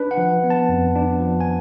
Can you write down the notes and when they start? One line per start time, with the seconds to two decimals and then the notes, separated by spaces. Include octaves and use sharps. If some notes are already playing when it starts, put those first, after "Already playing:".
Already playing: D4 B4
0.11 F#5
0.17 F3
0.44 B3
0.50 A5
0.69 F2
0.95 D4
1.20 F3
1.41 G#5